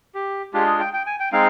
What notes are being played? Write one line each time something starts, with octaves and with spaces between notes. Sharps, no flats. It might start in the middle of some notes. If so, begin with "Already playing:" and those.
G4
G#3 D4 F4 G4
G#4
G5
G5
G#5
G5
G#3 C4 D#4 F5